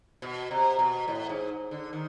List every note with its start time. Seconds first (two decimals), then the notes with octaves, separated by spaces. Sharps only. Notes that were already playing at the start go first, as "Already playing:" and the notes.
0.22 B2
0.51 C3
0.79 B2
1.08 A2
1.29 G#2
1.71 D3
1.93 D#3